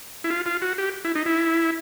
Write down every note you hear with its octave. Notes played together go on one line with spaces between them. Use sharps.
E4
F4
F4
F#4
G4
E4
D#4
E4